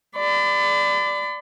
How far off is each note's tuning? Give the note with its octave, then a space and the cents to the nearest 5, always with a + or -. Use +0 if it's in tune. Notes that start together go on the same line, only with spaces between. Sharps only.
D5 +0 B5 +40